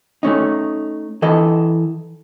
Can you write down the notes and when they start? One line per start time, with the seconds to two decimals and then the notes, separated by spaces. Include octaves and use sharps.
0.23 A3 C#4 D#4
1.22 E3 A4 D#5